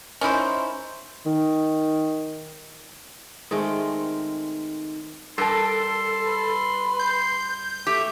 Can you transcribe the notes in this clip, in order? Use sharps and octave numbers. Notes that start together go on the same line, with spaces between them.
C#4 D#4 E4 C5
D#3
D#3 G#3 A3 C4
G2 A4 A#4 A5 C6
B4
G6
A3 G4